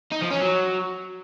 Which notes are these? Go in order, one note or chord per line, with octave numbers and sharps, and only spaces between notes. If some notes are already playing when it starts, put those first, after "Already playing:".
D#4
F3
C#4
F#3